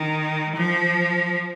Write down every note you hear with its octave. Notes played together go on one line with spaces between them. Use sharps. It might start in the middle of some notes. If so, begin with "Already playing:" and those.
Already playing: D#3
F3